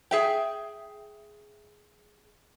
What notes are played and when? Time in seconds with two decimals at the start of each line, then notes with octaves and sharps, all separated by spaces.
0.11 G#4 E5 G5